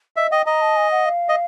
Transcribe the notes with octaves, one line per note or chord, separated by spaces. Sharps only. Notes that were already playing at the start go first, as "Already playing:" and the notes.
D#5 E5
D#5 G5
D#5 A#5
A5
G#5
F#5
F5
D#5